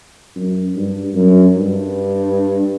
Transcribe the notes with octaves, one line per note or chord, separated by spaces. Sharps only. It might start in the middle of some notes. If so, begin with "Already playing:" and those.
F#2
G2
F#2
G2